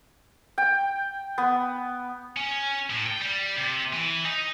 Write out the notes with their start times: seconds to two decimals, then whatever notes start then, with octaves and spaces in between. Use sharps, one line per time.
0.58 G5
1.38 B3
2.37 C#4
2.90 A2
3.07 G5
3.22 G3
3.57 C3
3.93 E3
4.25 D#4